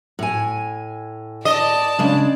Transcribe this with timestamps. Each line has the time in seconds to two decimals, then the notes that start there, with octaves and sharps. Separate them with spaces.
0.19 A2 G#5
1.45 D5 D#5 A5
1.99 C#3 G#3 D4